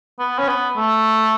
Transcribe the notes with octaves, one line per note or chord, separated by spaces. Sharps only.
B3
C#4
B3
A3